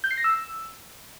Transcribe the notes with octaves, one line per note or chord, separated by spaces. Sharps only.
G6
C7
A#6
E6